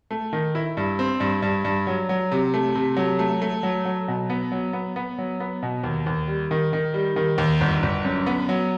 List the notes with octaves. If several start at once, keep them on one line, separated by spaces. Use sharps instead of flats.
A3
D#3
E4
G2
C4
G2
G2
G2
F#3
F#3
C3
A3
C3
F#3
A3
A3
F#3
F#3
B2
B3
F#3
B3
B3
F#3
B3
B2
D#2
D#2
G3
D#3
D#3
G3
D#3
D#2
G1
G1
F#2
B3
F#3